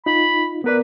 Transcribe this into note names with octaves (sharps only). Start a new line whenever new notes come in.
D#4 F4 B5
B3 A#4 B4 D5